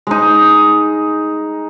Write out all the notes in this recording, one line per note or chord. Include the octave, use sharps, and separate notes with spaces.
G#3 D#4